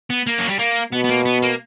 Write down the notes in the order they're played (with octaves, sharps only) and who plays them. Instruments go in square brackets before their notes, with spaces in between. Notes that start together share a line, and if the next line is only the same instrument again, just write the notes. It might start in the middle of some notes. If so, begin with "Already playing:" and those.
[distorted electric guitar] B3
A#3
F#3
G3
A#3
[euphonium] B2 [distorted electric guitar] B3
[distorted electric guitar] B3
A#3
B3
A#3